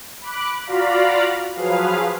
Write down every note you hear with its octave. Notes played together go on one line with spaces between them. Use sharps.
B5 D6 F#6
F4 F#4 D5 F5 A#5 B5
F3 F#3 G#4 B4 F5